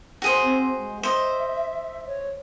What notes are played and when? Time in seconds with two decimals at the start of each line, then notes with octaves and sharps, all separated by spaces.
0.22 F#4 G#4 C5
0.43 C4
0.79 G#3
1.03 C5 D#5 E5
2.06 C#5